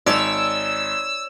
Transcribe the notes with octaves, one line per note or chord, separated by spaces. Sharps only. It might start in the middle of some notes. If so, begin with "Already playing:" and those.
G#1 C#5 D5 E6